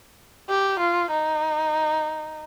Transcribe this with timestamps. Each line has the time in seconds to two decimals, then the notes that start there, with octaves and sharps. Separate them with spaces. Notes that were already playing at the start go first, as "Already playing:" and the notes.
0.49 G4
0.79 F4
1.11 D#4